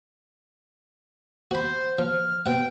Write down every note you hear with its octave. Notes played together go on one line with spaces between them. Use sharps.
F#4 C5 B5
F3 F6
B2 F#5 G5